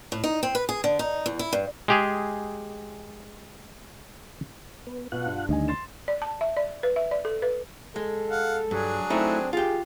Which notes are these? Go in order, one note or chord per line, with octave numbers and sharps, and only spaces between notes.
A2
D#4
C4
B4
G#4
D3
D#4
E2
E4
G2
G#3 G4 G#4
B3
B2 F4 B4 F#5
G2
D2 D3 D#3 G3 D#5 G#5
C6 A6 E7
D5
A5
E5
D5
B4
E5
D5
A4
B4
G#3 A4
F5 F#5
G2 F#3 D4 G#4
A3 C4 D#4 E4
F4 G4 G#4